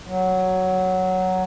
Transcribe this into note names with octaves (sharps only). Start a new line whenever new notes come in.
F#3